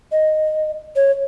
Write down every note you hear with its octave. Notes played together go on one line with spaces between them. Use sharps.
D#5
C#5